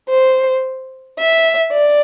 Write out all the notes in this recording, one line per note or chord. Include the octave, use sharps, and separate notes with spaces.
C5
E5
D5